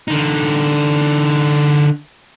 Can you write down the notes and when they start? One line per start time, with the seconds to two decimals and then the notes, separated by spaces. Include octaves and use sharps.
0.08 D3 D#4